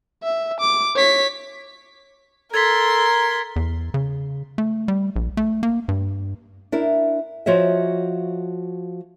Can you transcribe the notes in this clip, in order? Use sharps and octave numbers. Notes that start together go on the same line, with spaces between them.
E5
D6
C#5 B6
A4 A#4 C6 G#6 A6 B6
E2
C#3
A3
G3
A#1
A3
A#3
G2
D4 E4 A#4
F3 F#4 C#5 D#5 E5